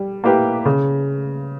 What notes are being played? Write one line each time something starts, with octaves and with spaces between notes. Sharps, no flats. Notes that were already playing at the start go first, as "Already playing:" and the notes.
Already playing: G3
A#3 E4 G4 B4
C#3